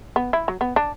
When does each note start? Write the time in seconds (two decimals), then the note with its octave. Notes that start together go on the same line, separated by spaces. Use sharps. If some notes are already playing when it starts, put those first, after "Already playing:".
0.16 B3
0.33 E4
0.48 F#3
0.61 B3
0.76 D4